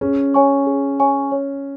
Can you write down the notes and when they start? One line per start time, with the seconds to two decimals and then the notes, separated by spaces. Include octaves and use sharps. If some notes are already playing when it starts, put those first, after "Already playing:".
0.01 C#4 G#4
0.34 C#5 G#5 C#6
0.67 G#4
1.00 C#5 G#5 C#6
1.32 C#5